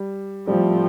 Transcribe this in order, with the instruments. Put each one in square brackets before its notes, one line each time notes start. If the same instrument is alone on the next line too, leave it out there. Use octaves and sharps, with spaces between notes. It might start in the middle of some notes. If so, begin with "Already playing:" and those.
Already playing: [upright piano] G3
[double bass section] A2 F3 A3 C4 [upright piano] G3